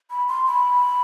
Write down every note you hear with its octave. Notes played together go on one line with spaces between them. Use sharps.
B5
C6
B5